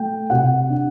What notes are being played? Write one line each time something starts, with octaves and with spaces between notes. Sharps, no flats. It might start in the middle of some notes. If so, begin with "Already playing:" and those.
Already playing: A3 G5
C3 F#5
D4